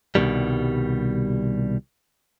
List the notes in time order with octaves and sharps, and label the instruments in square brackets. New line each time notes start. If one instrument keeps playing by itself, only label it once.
[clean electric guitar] C2 F2 B2 D#3 G3